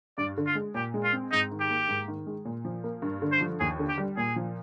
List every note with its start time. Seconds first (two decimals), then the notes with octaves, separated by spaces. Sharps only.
0.18 G2 D5
0.37 D3
0.46 F4
0.55 G#3
0.74 A#2 G4
0.94 G#3
1.04 F4
1.13 C4
1.32 G#2 D#4
1.51 D#3
1.60 G4
1.70 A#3
1.88 G#2
2.08 D#3
2.27 G#3
2.45 A#2
2.65 F3
2.84 A#3
3.02 G2
3.22 D3
3.32 C5
3.41 F3
3.60 D#2 G#4
3.79 D3
3.88 G4
3.98 G3
4.17 A#2 G#4
4.36 F3